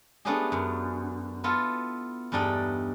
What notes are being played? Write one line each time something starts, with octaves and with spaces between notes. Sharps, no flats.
A3 B3 C#4 D4 G4 G#4
F#2
B3 E4 F4 A4 B5
E2 G2 A3 D4 D#4 G5